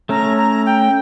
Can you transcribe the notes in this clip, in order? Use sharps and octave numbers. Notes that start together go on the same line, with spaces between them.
A3 C#4 A#5
A#5
G5